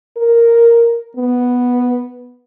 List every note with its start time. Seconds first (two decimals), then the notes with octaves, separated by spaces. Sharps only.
0.17 A#4
1.17 B3